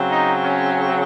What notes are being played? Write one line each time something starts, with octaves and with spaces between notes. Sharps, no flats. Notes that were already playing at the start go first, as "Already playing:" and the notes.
Already playing: C#3 F#3 C4
D#4
C#4